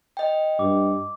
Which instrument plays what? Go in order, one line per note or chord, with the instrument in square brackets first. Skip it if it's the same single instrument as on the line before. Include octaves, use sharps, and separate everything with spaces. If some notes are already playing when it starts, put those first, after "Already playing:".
[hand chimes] D#5 G5
[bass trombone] G2 [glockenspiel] D6